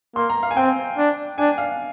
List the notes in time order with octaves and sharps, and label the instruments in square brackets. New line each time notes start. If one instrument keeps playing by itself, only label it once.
[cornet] A#3 [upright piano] C6
[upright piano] A#5
F5
G#5
[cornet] C4 [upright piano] G5
[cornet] D4
[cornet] D4 [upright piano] G#5
[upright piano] F5